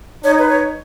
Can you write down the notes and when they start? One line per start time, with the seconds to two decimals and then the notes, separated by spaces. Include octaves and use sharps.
0.24 D#4 C#5
0.39 B4
0.49 C#5